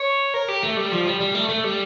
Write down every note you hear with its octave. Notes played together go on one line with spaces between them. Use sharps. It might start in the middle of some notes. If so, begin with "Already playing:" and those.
Already playing: C#5
A#4
G4
A3
G3
F3
G3
G3
A3
A3
G3